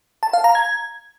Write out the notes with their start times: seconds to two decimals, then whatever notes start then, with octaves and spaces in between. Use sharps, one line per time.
0.23 A5
0.33 F5
0.44 A#5
0.55 G#6